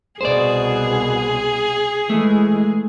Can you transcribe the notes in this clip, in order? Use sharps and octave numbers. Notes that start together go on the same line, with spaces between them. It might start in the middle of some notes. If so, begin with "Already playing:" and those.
C2 B2 G#4 C5 D5
E3 G#3 A3